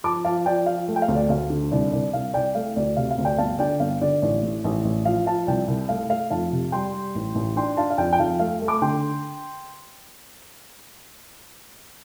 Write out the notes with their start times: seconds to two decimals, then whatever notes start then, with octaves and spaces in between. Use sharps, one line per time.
0.04 F3 A5 D6
0.25 F3 F5 A5
0.46 F3 D5 G5
0.66 F3 F5
0.88 A3
0.96 G5
1.02 F5
1.08 D2
1.15 D5
1.29 D2 F5
1.50 D3
1.71 C2 D5
1.92 C2 D5
2.13 C2 F5
2.34 C2 D5 G5
2.55 A3 F5
2.76 D2 D5
2.97 C3 F5
3.11 F5
3.18 D2
3.25 D5 G5
3.38 G1 F5 A5
3.59 D3 D5 G5
3.80 G1 F5
4.01 D3 D5
4.22 A1 D5
4.43 A2
4.64 A1
4.85 A1
5.05 F3 F5
5.26 F3 F5 A5
5.47 C2 D5 G5
5.68 C2
5.89 A3 F5
6.10 A3 F5
6.31 F2 F5 A5
6.52 C3
6.72 G3 G5 C6
6.94 G3
7.15 A1
7.35 A1
7.56 D4 G5 C6
7.77 D4 F5 A5
7.90 F5
7.98 F2 D5 G5
8.13 G5
8.19 F2 F5 A5
8.39 A3 F5
8.62 A3
8.67 A5 D6
8.82 D3 G5 C6